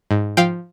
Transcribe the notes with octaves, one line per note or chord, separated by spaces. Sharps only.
G#2
F3 F5 G5